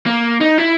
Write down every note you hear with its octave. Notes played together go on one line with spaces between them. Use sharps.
A#3
D#4
E4